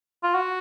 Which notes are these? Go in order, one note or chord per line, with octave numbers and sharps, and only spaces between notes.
F4
F#4